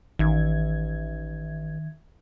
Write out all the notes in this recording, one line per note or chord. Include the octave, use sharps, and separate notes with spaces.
A1 D#3 E5 G#6